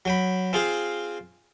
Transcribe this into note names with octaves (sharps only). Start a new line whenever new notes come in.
F#3 G5 B5
C4 F4 G#4 C5 F5